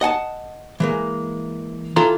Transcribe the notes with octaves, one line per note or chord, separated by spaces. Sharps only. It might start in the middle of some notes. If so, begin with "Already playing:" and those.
D#5 F#5 G#5 A5
E3 G#3 A#3
E3 F4 A4 A#5 C6